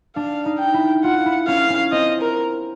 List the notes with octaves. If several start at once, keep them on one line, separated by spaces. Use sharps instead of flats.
D4 F5
D#4
G5
E4
F4 F#5
E4
C#4 F5
C#4
C4 D#5
A#4